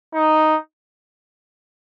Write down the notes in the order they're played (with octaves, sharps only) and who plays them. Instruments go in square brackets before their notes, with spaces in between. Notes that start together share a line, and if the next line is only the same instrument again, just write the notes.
[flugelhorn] D#4